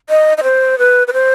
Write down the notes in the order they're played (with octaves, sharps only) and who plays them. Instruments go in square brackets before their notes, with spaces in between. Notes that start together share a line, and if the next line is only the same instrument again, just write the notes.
[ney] D#5
D#5
C5
B4
B4
C5